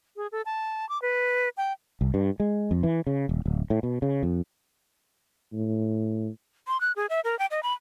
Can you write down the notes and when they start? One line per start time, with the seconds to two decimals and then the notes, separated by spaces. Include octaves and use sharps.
0.17 G#4
0.32 A4
0.46 A5
0.89 D6
1.02 B4
1.57 G5
2.01 C2
2.14 G2
2.40 G#3
2.71 F2
2.83 E3
3.07 C#3
3.29 D#1
3.46 D1
3.70 A2
3.83 B2
4.02 C#3
4.23 F2
5.53 A2
6.68 C6
6.81 F#6
6.96 G#4
7.10 E5
7.24 A#4
7.39 G5
7.51 D#5
7.63 B5